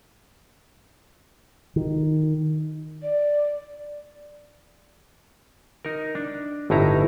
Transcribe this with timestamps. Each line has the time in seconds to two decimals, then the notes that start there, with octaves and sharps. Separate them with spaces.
1.76 D#3
3.03 D5
5.85 D#4 A#4
6.15 D4
6.70 G1 A2 D#4 E4 A#5